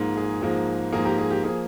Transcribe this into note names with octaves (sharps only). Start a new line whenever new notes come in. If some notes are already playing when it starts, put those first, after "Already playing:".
Already playing: G#2 F3 A#3
G#4
G#2 F3 A#3
G#2 F3 A#3 G#4
G4 A#4
G#4
G4
F3 A#3 G#4